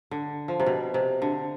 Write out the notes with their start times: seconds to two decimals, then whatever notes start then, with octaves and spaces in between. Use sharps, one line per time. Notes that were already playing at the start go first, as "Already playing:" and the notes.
0.11 D3
0.48 F3
0.60 C3
0.66 B2
0.94 C3
1.22 D3